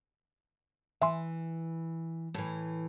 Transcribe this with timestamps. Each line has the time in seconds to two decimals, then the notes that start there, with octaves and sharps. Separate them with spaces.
1.02 E3 E5 G#5 C6
2.34 A2 E3